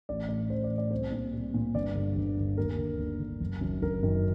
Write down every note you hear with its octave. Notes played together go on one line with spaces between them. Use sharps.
A1 D5
A2 D5
A1 C5
D5
A2
D5
C2 C5
A#2
C2
A#2
G1 D5
G2 D3
G1
G2 D3
D#2 A#4
D3
D#2
D3
F#1
F#2 D#3
F#1 A#4
F#2 D#3